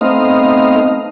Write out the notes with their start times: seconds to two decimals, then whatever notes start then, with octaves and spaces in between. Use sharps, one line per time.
0.01 A3 B3 C4 D#4 D#5 F5